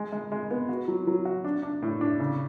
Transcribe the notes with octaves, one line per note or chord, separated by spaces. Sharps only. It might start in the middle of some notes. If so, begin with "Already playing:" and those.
Already playing: G#3
G#3
G#3
B3
F#4
F#3
F#3
F#4
D4
D4
A2
D4
C#3